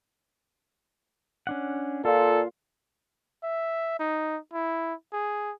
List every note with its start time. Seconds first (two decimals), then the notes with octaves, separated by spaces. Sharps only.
1.47 C#4 D4 F#5
2.05 A#2 F4 A4
3.43 E5
3.99 D#4
4.54 E4
5.13 G#4